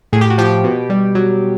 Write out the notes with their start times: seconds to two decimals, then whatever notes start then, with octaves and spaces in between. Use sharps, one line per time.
0.13 A2 G#4
0.21 G4
0.30 F#4
0.38 F3 G4
0.64 B2
0.90 G3
1.15 F#3